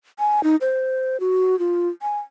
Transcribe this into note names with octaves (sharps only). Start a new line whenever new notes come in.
G#5
D#4
C5
F#4
F4
G#5